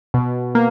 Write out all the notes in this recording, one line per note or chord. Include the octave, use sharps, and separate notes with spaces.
B2
A#3